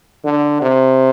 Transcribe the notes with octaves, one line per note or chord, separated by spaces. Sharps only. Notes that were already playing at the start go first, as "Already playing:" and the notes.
D3
C3